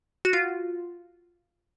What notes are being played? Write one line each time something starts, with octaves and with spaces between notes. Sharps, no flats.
F#4
F4